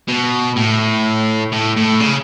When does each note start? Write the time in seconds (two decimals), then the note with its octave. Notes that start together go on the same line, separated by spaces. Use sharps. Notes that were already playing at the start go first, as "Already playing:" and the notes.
0.08 B2
0.56 A2
1.52 A2
1.76 A2
2.00 C#3